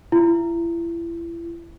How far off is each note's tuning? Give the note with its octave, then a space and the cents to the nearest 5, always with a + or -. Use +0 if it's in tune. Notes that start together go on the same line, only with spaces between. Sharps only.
E4 +35